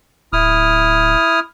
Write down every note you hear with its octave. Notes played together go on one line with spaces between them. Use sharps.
D1 E4 D#6 F6